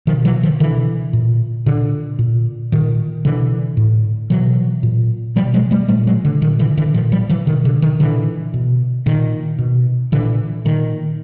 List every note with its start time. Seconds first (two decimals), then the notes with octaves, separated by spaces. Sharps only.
0.07 B2 D#3 F3
0.25 E3 F#3
0.43 D#3 F3
0.60 B2 D3 E3
1.13 A#2
1.66 A#2 D3
2.19 A#2
2.72 A#2 D#3
3.25 B2 D3 E3
3.77 A2
4.30 B2 E3 F#3
4.83 A#2
5.36 B2 F3 G3
5.54 F#3 G#3
5.71 G3 A3
5.89 A#2 G3 A3
6.07 F#3 G#3
6.25 D3
6.42 A#2 D#3
6.59 D3 E3
6.77 D3 E3
6.94 A#2 D#3 F3
7.12 F3 G3
7.29 E3 F#3
7.47 B2 D#3
7.65 D3
7.82 D#3
8.00 A#2 D3 E3
8.54 B2
9.06 A#2 D#3
9.59 B2
10.12 A#2 D3 E3
10.65 A#2 D#3